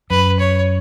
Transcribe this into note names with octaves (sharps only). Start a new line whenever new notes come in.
F#2 B4
C#5